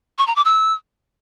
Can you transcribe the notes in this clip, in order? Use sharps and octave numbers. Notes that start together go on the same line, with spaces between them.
C#6
A#5
D6
E6